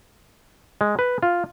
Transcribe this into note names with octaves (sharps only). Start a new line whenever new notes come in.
G#3
B4
F4